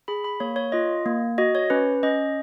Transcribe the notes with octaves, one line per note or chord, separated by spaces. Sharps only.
G#4 B5
B5
A#3 C#5
C#5
F4 D#5
A#3
F#4 D#5
C#5
C#4 B4
C#4 D#5